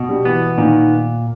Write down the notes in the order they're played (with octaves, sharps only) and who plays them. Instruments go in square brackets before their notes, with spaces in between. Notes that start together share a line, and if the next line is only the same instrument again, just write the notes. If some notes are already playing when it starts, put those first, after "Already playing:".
Already playing: [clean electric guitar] B2
[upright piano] G3
[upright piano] E3 [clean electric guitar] B3
[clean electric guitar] A#2 [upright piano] D#3